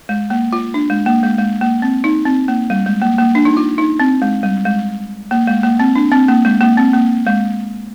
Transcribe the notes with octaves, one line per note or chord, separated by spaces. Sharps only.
G#3
A#3
F4
D4
G#3
A#3
G#3
G#3
A#3
C4
D#4
C4
A#3
G3
G#3
A#3
A#3
D4
D#4
F4
D#4
C4
G#3
G3
G#3
A#3
G#3
A#3
C4
D4
C4
A#3
G#3
A#3
C4
A#3
G#3